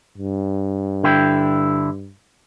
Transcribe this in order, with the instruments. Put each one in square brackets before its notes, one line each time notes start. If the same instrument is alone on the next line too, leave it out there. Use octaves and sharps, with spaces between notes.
[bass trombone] G2
[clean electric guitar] D3 E4 G5